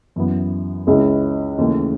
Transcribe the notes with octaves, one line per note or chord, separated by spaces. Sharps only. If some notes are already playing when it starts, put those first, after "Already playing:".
F#2 E3 B3
C#2 C#3 G#3 C#4 E4
D#2 C#3 E3 A3